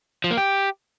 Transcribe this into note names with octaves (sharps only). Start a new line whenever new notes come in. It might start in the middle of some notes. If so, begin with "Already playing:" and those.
F3
A#3
G4